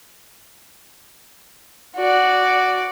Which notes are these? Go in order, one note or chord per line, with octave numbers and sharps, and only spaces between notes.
F#4 D5